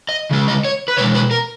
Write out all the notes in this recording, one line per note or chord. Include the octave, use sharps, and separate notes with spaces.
D#5
C#3 G#3
D#5
C#5
B4
B2 G#3 C#5
B4
A#4